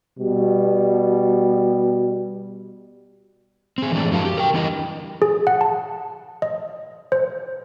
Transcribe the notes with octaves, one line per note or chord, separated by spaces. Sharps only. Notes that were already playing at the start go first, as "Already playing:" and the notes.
B2 G3
C4 G#4
A2 E3 F3 G#3 A3 D4
F#2 F#4 A#4 F5 A5
G4
A#4 G5
E3 G3 D4 E4 A#4 D#5
G#4
F#5
A5
D#5
C5